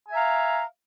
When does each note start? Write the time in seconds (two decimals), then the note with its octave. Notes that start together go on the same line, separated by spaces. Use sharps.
0.08 G#5
0.11 E5
0.14 A#5
0.17 F5